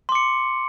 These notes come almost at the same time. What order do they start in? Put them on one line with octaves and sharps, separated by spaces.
C6 D6 C#7